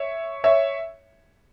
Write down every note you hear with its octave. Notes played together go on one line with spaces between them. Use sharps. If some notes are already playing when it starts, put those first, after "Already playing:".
Already playing: C#5 E5
C#5 E5